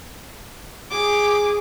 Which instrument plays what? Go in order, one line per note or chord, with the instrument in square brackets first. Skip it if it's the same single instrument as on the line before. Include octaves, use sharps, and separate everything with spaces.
[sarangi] G#4 [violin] D6